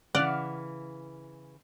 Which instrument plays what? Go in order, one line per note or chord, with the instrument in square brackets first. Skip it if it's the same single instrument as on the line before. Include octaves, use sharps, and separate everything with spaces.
[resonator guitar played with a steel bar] C#3 E3 [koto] D5 [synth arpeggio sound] F#5 F6